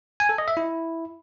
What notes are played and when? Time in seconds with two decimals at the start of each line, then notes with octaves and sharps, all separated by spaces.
0.20 G#5
0.29 A4
0.38 D#5
0.48 E5
0.57 E4